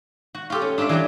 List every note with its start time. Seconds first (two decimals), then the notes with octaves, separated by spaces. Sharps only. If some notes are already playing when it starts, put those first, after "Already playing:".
0.35 F#4
0.50 F4 G4 A4
0.62 C#4
0.78 D4 F4 A4 D5 E5
0.89 E3 F#3 G3 G4